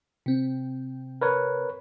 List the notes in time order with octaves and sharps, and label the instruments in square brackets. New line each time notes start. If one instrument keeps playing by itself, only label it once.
[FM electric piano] C3 C4
[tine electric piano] A#4 B4 C#5